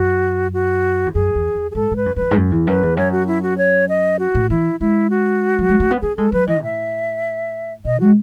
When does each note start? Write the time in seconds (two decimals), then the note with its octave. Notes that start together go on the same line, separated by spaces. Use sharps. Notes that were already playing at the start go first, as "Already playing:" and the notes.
Already playing: F#2 F#4
0.54 F#4
1.06 E2
1.14 F#2 G#4
1.35 E2
1.55 E2
1.71 G#4
1.75 G#2 A4
1.91 G#2
1.96 B4
2.06 F#2
2.16 F#2 B4
2.22 E2
2.31 G#2
2.37 F#2
2.51 E2
2.67 F#2 B4
2.83 E2
2.97 F#2 C#5
3.12 F#4
3.27 E4
3.43 F#4
3.58 C#5
3.89 D#5
4.19 F#4
4.35 A2
4.50 E3 E4
4.80 G#3 E4
5.10 F#4
5.59 F#3
5.69 G#3
5.80 A3
5.91 B3
6.02 C#4 G#4
6.17 G#3 A4
6.32 F#3 B4
6.47 E3 D#5
6.63 A2 E5
7.85 B2 D#5
8.00 G#3 F#4